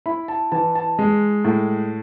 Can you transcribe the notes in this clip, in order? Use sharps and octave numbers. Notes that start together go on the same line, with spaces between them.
E4 B5
A5
E3 A5
A5
G#3
A2